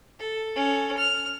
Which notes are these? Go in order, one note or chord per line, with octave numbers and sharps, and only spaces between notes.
A4
C#4 A4
F6